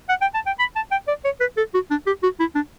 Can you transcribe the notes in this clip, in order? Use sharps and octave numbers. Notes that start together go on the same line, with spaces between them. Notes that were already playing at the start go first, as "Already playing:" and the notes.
F#5
G5
A5
G5
B5
A5
G5
D5
C#5
B4
A4
F#4
D4
G4
F#4
E4
D4